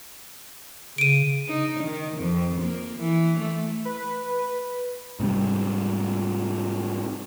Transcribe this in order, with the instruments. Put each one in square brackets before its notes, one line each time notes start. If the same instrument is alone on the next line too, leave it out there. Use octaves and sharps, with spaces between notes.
[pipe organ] C#3 [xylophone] D7 D#7
[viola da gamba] D#4
D#3
F2
A#3
E3
A3
[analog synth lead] B4
[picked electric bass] G#2 C3 G3